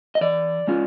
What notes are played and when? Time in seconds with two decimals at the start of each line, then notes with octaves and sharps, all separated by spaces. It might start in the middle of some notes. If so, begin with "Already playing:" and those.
0.15 D#5
0.21 E3 D5
0.68 G#3 C#4 F4